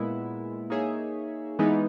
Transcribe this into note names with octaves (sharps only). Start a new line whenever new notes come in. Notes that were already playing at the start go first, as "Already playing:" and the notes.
Already playing: A#2 G#3 B3 E4
A#3 D#4 G#4 C#5 E5
E3 G#3 B3 D#4